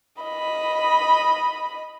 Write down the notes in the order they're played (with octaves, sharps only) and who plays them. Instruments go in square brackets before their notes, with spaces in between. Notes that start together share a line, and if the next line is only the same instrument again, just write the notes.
[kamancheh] D#5 B5